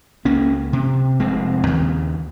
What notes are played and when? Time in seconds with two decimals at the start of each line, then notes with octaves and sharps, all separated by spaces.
0.25 C#2 A#3 C#4
0.73 C3
1.20 F1 G#3 C4
1.67 D#2 C#3